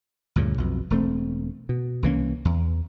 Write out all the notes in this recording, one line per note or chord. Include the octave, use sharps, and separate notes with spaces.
D2 G2 A#2 C#3
B1 F2 B2
E1 A3 C4
B2
C2 E3 A#3 C#4
E2